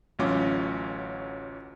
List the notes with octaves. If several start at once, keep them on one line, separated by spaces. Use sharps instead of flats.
A1 D2 F#3 C#4 F4 D6